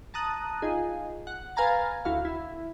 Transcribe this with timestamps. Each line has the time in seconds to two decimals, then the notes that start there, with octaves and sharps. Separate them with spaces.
0.14 A5 A#5 D#6 F#6
0.62 D#4 F4 G#4
1.27 F#5
1.56 B4 F5 G#5 A#5 A6
2.05 D2 E4 F#4 F5
2.25 E4